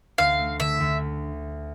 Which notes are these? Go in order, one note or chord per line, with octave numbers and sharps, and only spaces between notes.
D2 F5
A3
D3 E5
D2